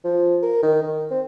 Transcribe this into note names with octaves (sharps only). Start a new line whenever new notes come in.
F3
A#4
D#3
D#3
C4